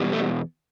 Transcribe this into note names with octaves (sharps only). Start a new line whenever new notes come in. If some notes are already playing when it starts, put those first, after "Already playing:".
Already playing: E2 B2 G3
A3